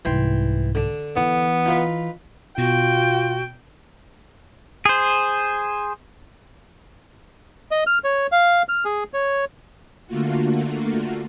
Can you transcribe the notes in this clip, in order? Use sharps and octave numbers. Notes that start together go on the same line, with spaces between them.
C2 G#2 E3 G5 C6
D3 D4
E3 B3
D#4 F4 B4
B2 F4 F#4 G5
G#4 C5
D#5
F6
C#5
F5
F6
G#4
C#5
D3 A3 A#3 F4 F#4